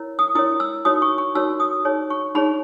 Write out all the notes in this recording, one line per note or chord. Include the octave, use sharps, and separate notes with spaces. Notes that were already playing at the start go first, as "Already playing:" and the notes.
Already playing: E4 A#4 C#5
D#6
E4 A#4 C#5 D#6
E6
D#4 F#4 A#4 C#5 D#6
C#6
C#6
D#4 F#4 A#4 C#5 E6
D#6
D#4 G#4 C#5
C#6
D#4 G#4 C#5 B5